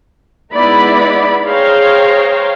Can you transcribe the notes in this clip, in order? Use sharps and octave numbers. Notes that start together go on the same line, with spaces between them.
G#3 B3 D#4 E4 D5 B5
G#4 C5 C#5 F5 G5 A#5